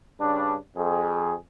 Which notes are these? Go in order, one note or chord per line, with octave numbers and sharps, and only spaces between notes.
G2 C#3 D4
F2 G#4